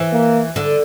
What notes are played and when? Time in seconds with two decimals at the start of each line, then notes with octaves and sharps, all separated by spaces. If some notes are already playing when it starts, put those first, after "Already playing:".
Already playing: E3
0.13 A#3
0.56 D3